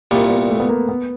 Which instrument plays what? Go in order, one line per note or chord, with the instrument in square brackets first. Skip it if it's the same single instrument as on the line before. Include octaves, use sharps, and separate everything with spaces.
[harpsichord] C2 A#2 G3 [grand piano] A#3
[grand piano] B3
A3
B3
A#3
B3